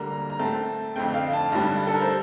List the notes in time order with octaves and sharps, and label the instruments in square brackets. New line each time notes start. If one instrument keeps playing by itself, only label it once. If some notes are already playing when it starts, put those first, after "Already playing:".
Already playing: [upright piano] D2 D3 G3 A#3 A#5
A#5
A#5
A2 A3 C4 A5
F2 D3 A3 C4 G5
F5
A5
G2 D3 G3
A4
A#4
C5